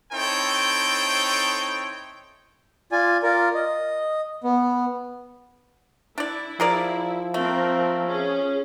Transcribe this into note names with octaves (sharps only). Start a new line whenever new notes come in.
C4 D#4 E4 A4 C#5 G5
F4 D5 G#5
F4 A#4 D5
D#5
B3
D4 E4 D5
F3 G#4 A#4 D5
A3 C4 A#4
C#4 G#4